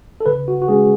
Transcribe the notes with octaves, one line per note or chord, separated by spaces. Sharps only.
A4
C#3 B4
F#4
F#4
G#3 C#4 G#4